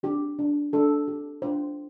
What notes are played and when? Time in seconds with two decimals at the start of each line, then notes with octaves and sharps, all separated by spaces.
0.03 D4 G4
0.39 D4
0.73 D4 A4
1.08 G4
1.42 D4 C5